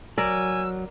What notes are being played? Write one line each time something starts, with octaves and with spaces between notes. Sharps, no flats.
F#3 A#4 D5 G#5 E6